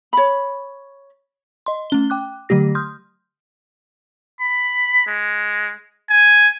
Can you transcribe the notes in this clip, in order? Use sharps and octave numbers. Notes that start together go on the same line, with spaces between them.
C#5 B5
D#5 C6
A3 C#4 G7
G5 D6 F#6
D3 F#3 A3 G4 A#6
C6 D#6 F6 G6
B5
G#3
G#5